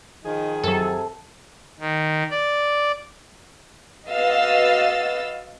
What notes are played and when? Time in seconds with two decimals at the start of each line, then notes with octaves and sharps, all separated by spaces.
0.24 D#3 F3 D#4 G#4
0.63 F#2 C3 F#3 A4
1.79 D#3
2.30 D5
4.09 F#4 B4 D#5 F5 E6 A6